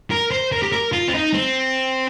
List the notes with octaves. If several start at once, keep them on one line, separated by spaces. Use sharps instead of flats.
A#4
C5
A#4
G4
A#4
F4
C4
D#4
C4